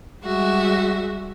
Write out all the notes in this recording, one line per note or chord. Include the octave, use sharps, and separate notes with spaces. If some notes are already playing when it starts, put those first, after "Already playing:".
G3 G#3 F#4 E5